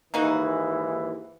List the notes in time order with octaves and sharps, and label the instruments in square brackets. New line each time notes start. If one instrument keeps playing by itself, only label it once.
[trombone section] D#2 G#2 E3 [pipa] A#3 D#4 F#4